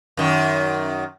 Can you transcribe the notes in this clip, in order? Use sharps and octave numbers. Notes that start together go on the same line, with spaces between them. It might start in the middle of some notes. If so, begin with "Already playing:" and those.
F#2 D#3